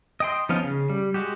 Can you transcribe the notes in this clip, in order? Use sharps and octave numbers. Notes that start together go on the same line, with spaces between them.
D#5 G5 C6
F3 B3 C#4 D#4 F4
C#3
G3
G#3 F#4 G4